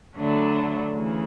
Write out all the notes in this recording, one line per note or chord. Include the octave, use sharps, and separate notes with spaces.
D2 D3 F#3 A3 D4
D2 C#3 E3